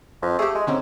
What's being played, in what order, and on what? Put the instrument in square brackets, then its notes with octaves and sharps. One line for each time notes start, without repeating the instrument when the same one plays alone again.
[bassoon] F2
[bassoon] A3 [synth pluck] G4 G#4
[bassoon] G#3
[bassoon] G#2 [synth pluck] D3 C4 C#4